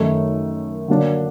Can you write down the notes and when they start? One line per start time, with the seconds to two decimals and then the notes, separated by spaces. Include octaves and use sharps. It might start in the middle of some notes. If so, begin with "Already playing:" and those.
Already playing: F#2 D#3 A3 D#4
0.88 D3 F#3 A#3 D4